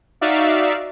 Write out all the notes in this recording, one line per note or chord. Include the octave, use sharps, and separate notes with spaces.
D#4 F#4 D5 E5 F5